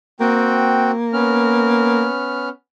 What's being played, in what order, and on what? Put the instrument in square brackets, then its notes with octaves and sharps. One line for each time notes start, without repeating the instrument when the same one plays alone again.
[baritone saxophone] A#3 [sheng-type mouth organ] C4 F#4 G5
[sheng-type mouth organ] B3 C#4 F6